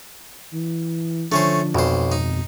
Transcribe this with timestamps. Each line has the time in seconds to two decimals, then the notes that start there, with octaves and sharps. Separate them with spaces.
0.53 E3
1.32 D3 F3 A3 C#4 D4 C5
1.75 B1 F2 B2 C5
2.12 G#1 D#4